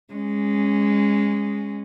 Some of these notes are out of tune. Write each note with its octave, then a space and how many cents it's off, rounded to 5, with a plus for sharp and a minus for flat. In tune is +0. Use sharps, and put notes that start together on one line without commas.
G#3 -15 C#4 +0